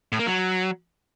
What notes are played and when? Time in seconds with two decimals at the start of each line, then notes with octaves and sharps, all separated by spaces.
0.12 A2
0.19 A#3
0.26 F#3